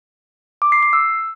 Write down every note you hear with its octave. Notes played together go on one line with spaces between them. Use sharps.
D6
C7
C7
E6